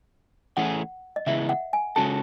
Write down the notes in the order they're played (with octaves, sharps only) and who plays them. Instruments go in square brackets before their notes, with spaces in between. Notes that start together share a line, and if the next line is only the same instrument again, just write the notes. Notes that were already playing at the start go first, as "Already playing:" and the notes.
[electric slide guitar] E3 A3 C#4 E4 G#4 [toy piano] F#5
[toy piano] D#5
[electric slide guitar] C#3 E3 G#3 B3 E4 [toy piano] E5
[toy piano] F#5
G#5
[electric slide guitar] C#3 G#3 C#4 F#4 A4 [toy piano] A5